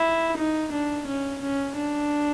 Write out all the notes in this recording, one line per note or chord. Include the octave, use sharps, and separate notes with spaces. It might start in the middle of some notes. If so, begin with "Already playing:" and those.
Already playing: E4
D#4
D4
C#4
C#4
D4